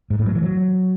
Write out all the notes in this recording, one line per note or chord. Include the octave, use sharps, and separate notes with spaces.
G#2
A2
F#3
E3
F#3